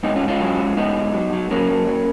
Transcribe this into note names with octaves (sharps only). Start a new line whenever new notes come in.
G#2 B3 D#4
C#4 F4
G#2
C#4 F4
F#3
G#2
G#2 B3 D#4
G#2
F#3
F#3
F#3 A#3 C#4
F#2
F#3